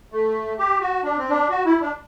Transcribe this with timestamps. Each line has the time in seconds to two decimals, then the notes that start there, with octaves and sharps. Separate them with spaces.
0.12 A3
0.58 G4
0.81 F#4
1.03 D4
1.18 C4
1.30 D4
1.50 F#4
1.65 E4
1.81 D4